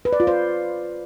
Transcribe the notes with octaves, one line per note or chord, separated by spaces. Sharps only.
B4
D5
F4
C5